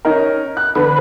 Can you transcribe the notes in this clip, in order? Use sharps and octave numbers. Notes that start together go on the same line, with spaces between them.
C#4 D#4 A#4
F#6
D3 B4